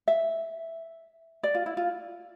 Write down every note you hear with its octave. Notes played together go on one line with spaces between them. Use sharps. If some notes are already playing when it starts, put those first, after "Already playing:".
E5
D5
F4
E4
F4